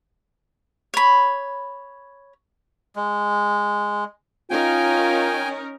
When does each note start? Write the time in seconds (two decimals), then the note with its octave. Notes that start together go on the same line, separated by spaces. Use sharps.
0.94 C#5 B5
2.96 G#3
4.50 C#4 D#4 F4 A#4 G5 G#5